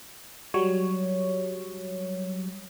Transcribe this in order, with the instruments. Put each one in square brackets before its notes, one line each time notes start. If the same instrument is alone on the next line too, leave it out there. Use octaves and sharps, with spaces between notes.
[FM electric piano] F#3 G3 C#5